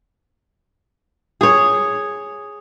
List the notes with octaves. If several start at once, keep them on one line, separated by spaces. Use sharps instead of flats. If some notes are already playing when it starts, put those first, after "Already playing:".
G#4 C#5